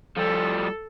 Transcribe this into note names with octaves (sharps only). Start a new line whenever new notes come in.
F3 G3 A4